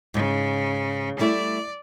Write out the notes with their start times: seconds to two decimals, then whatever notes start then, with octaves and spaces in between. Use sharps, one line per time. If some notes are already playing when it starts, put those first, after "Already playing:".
0.14 G#2 C#3
1.19 G3 A3 E4 D5